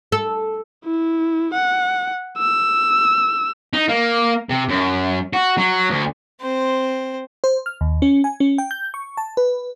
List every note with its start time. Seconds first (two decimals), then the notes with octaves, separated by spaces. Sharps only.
0.12 A4
0.85 E4
1.54 F#5
2.39 E6
3.73 D#4
3.88 A#3
4.49 C3
4.69 F#2
5.33 F#4
5.58 F#3
5.90 D2
6.41 C4 C5
7.44 C5
7.66 F6
7.81 D#2
8.02 C#4
8.24 G#5
8.40 C#4
8.58 G5
8.71 G6
8.94 C#6
9.17 A5
9.37 B4